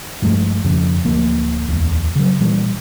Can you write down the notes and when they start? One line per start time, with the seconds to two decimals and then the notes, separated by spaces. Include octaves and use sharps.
0.22 G2 F3 G#3 A3
0.64 F2 C#3 F3
1.04 D1 F3 A3 A#3
1.68 D1 E2
2.15 C#3 F#3
2.40 A#2 E3 G3